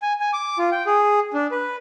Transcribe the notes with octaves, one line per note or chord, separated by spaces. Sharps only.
G#5
G#5
D6
F4
G5
G#4
D4
B4